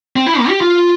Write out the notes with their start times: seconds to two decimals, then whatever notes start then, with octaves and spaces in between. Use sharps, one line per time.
0.16 C4
0.26 E4
0.39 A#3
0.49 G4
0.61 F4